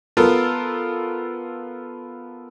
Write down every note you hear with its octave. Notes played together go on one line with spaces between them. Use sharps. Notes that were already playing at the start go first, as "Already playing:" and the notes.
B3 F4 A4 A#4